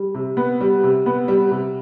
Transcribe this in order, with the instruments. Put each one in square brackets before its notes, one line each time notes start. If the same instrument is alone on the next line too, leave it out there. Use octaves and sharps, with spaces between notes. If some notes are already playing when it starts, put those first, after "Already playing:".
Already playing: [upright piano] G3
C3
B3
G3
C3
B3
G3
C3